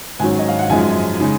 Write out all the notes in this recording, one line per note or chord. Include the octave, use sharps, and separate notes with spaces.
G#2 D#3 F#3 C#4 G#5
D#5
F5
F#5
F#2 F3 G#3 D#4 G#5
C#3 G#3 D#4